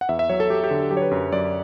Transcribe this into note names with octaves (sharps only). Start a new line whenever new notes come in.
F#5
E2 E5
E5
F#3 C#5
A4
F#3 G4
G4
D3
F#3 G4
C#5
B4
F#2
F#2 D5